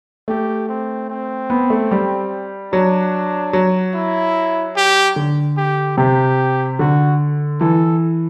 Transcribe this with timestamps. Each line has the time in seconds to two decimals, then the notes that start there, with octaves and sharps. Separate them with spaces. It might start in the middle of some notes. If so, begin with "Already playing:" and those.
0.28 A3 G4
0.69 C4
1.10 C4
1.50 B3
1.70 A3
1.91 G3
2.73 F#3 D4
3.53 F#3
3.94 E4
4.76 G4
5.16 D3
5.57 G4
5.98 C3 G4
6.79 D3 F#4
7.61 E3 A4